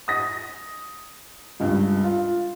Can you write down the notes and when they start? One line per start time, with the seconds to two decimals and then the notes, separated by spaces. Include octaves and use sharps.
0.08 D#6 A#6
1.60 C#2 G2
2.04 F4